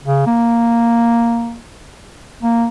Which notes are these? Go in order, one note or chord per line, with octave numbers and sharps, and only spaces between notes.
C#3
A#3
A#3